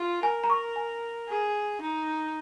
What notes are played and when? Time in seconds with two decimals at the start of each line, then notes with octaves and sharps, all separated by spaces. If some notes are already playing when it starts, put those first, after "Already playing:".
Already playing: F4
0.23 A#4 G#5
0.44 A#5
0.50 C#6
0.76 G#5
1.29 G#4
1.81 D#4